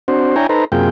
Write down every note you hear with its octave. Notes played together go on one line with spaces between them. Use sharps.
C4 D4 F#4 C5
D4 E4 C#5 G5 G#5 A#5
D#4 A4 B4 C5 A#5
F#2 C3 A#3 F4 G#4 G5